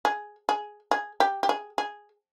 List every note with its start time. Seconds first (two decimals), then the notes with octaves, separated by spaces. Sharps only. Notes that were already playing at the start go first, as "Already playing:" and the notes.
0.05 G#4
0.49 G#4
0.91 G#4
1.20 G4
1.43 G4
1.49 G#4
1.78 G#4